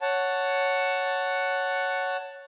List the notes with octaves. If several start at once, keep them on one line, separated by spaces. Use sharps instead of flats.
C#5 F#5 A5